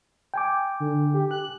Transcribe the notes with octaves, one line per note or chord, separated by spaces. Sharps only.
G5 G#5 D6
D3
G4
F#6